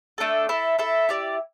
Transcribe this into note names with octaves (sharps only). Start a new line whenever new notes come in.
A3 D4 A4
E4 A4 E5
E4 A4 E5
E4 G4 D5